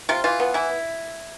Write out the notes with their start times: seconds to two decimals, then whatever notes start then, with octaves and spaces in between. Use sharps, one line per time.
0.09 C3 F4
0.24 E3 F4
0.40 B3
0.54 E3 E4